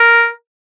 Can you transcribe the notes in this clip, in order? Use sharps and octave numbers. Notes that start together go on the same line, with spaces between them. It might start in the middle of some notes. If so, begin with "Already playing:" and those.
Already playing: A#4